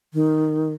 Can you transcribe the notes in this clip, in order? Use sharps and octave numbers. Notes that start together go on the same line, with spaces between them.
D#3